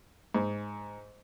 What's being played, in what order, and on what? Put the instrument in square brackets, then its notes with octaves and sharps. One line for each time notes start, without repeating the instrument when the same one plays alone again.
[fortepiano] G#2